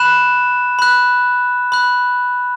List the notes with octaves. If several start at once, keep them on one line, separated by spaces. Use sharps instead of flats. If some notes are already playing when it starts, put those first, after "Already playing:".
Already playing: B5 F#6 E7
B5 F#6
B5 F#6